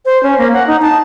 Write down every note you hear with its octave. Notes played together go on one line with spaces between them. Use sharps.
C5
C#4
A#3
F#5
D#4
A5